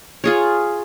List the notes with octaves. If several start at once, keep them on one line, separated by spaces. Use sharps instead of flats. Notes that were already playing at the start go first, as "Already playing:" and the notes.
F4 G#4 C#5